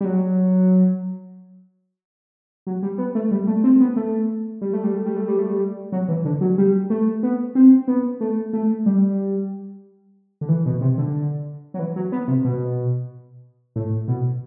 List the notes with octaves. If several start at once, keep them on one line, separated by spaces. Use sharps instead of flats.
G3
F#3
F#3
G3
B3
A3
G3
A3
C4
B3
A3
G3
A3
G3
A3
G3
A3
G3
A3
G3
F#3
E3
D3
F#3
G3
A3
B3
C4
B3
A3
A3
G3
D3
E3
B2
C3
D3
F#3
E3
F#3
B3
C3
B2
A2
B2